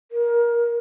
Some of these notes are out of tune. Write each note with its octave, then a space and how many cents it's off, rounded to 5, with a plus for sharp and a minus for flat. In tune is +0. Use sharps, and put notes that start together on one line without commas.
A#4 +20